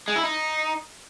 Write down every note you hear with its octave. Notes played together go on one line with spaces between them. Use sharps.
G#3
E4
D#4